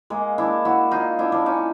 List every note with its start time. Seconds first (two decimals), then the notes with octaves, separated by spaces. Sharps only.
0.10 G#3 A#3
0.38 D4 E4
0.65 E4 F#4
0.91 D#4 F4
1.19 D4 E4
1.32 D4 E4
1.46 C#4 D#4